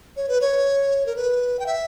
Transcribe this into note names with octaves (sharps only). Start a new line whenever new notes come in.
C#5
B4
C#5
A#4
B4
G5
E5